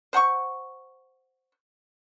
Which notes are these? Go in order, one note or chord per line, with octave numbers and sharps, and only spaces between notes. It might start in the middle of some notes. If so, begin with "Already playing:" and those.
C5 F#5 C6 C#6